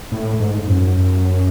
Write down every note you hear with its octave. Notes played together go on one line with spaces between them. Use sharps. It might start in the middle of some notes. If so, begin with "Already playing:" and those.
A2
G#2
F#2